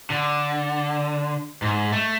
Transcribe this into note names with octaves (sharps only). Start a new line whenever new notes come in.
D3
G#2
A3